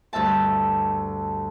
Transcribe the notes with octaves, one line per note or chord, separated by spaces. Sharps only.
D2 G2 E5 A5